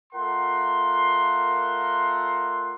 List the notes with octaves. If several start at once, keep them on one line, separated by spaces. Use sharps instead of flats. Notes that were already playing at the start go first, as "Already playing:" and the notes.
A3 F4 A#4 F#5 C6